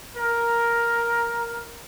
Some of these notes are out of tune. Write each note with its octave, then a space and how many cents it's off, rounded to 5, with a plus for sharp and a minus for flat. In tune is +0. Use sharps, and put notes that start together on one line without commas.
A#4 +5